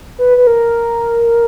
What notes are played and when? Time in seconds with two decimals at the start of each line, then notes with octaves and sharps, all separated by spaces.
0.19 B4
0.37 B4
0.47 A#4